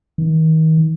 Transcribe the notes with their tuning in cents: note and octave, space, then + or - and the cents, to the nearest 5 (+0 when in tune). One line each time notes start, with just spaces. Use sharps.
D#3 +35